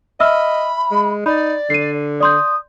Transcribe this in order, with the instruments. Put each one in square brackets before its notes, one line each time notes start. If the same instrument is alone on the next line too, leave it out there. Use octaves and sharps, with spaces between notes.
[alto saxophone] D#5 [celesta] E5 E6 F6 [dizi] B5
[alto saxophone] G#3
[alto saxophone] D#4 [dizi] D5 [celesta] B5
[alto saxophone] D3 [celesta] C7 D#7
[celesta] D5 C6 G6 [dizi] D#6